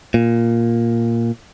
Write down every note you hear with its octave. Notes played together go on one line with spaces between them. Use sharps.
A#2